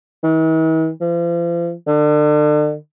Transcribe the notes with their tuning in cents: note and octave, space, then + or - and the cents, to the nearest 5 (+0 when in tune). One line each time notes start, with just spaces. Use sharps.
E3 -45
F3 -40
D3 +35